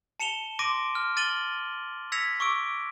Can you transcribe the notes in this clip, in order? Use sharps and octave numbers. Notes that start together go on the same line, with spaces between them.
A5 C#7 E7 F7 G7
C6 D6 A#6 D7 D#7
F6
F6 A6 D#7 F#7 G7
E6 G#6 A#6 B6 C#7 F7
C#6 D6 E6 D7